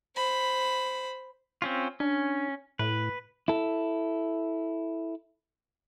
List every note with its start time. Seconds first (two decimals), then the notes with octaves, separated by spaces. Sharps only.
0.16 C5 B5
1.62 C4 C#4 F4
2.00 C#4 D4
2.79 A2 B4
3.48 E4 A4